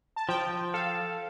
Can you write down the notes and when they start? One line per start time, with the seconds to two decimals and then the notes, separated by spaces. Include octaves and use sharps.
0.16 A5
0.29 F3 G5
0.74 A4 F5